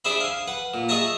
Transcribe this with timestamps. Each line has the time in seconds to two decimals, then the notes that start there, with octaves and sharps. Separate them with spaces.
0.05 D4 G#4 C5 E5 B5
0.20 F5 G#5
0.48 B4 F#5
0.74 A#2
0.89 G#4 C#5 D#5 E5 A5 A#5